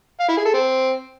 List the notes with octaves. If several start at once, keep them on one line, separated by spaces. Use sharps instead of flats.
F5
E4
G#4
A4
C4